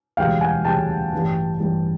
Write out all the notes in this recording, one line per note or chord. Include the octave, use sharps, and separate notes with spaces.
E1 D2 C#3 E3 G3 F5 G5
F#5 G#5
E1 D2 C#3 E3 G3 G5 A5
A1 G2 E3 G3
A1 G2 E3 G3